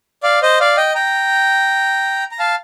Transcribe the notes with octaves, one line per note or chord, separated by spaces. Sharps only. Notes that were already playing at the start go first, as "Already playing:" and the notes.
D5 F5
C5 D#5
D5 F5
D#5 G5
G5 A#5
A#5
F5 A5